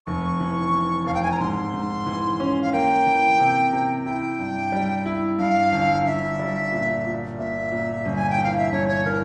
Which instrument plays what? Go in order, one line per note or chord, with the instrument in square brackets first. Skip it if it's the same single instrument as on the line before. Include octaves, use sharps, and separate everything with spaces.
[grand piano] F1 [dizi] C#6
[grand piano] E3
E3
[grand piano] F1 [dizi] F5
[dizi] G5
G#5
A#5
[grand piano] G#2 [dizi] C6
[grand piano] G#2
E3
C#4
[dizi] F5
[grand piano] A#3 [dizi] G5
[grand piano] E3
C3
C3
[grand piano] E4 [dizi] G5
[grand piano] G2
G3
E4
[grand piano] G2 [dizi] F5
[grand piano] G1
[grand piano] G1 [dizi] E5
[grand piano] G3
A#2
A#2
[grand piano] A#2 [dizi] E5
[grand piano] A#2
G1
[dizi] G#5
G5
[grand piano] E3
[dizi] F5
E5
[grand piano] G1 [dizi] C#5
[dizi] C#5
[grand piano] E3 [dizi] A#4